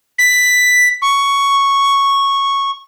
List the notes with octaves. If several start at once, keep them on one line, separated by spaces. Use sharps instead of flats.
B6
C#6